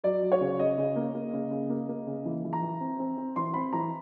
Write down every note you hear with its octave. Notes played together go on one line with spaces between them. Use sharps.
F#3 D5
F#3
C#5
C#3
C#3 D#5
C#3
A#3
A#3
C#3
C#3
A#3
A#3
C#3
E3
E3
A#5
E3
C4
C4
C4
E3 C6
C4 B5
E3 A#5